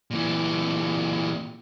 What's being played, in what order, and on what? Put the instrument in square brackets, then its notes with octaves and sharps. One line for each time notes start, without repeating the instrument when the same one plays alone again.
[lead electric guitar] A#2 E3